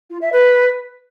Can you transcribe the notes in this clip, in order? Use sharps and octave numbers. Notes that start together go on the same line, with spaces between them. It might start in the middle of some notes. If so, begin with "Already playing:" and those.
F4
E5
B4